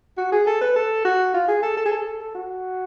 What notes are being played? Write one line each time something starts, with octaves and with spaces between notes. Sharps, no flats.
F#4
G#4
A4
B4
A4
F#4
F4
G#4
A4
A4
G#4
A4
A4
A4
F#4